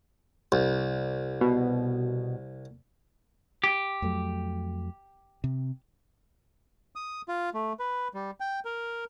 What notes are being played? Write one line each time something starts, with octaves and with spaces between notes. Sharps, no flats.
C2
B2
G4
F2 F#3 A3
C3
D#6
F4
A3
B4
G3
G5
A#4